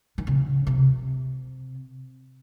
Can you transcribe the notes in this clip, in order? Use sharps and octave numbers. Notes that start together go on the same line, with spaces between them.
D#3
C#3
C3